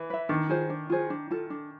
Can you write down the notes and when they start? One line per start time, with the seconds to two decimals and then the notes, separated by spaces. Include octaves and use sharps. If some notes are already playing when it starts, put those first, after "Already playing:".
Already playing: E3
0.10 B4 E5
0.29 D#3 D4
0.49 F4 G#4 C5
0.70 D4
0.90 F4 G#4 C5
1.10 D4
1.31 F4 A4
1.50 D4